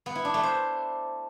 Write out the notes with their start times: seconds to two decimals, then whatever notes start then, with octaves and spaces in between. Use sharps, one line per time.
0.06 B3
0.15 E4
0.25 D4
0.34 A3
0.43 C5